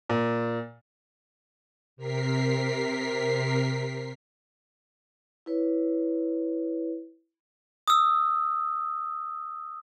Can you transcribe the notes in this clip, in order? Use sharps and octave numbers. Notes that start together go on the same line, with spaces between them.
A#2
C3 A#4 B6 C7
E4 B4 C#5
D#6 E6